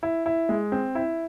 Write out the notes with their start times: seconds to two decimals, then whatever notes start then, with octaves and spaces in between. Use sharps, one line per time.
0.03 E4
0.26 E4
0.49 G#3
0.72 C4
0.95 E4